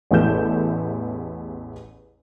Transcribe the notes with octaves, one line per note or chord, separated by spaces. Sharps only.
A1 E2 E4 A4 G6 E7